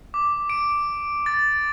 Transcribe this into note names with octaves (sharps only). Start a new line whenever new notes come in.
D6
D7
A6